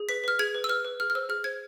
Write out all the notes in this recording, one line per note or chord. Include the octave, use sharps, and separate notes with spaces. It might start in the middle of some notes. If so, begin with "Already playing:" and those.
Already playing: G#4
B4 B6
B4 F6
G#4 G#6
B4
E6
B4 F6
B4
G#4 F6
F6
C5 E6
G#4 F6
C5 G#6